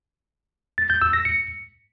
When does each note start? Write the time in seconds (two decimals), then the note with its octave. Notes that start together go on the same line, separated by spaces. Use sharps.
0.78 A6
0.90 G6
1.02 E6
1.13 A#6
1.25 C#7